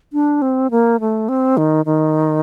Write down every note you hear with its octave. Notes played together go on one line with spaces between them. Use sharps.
D4
C4
A#3
A3
C4
D#3
D#3